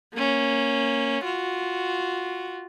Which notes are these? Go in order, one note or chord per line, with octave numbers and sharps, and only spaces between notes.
A#3 C#4
F4 F#4